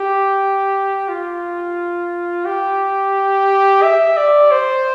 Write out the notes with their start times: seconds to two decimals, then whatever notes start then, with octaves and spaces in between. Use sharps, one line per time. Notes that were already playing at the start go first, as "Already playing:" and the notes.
Already playing: G4
1.08 F4
2.45 G4
3.83 E5
4.17 D5
4.51 C5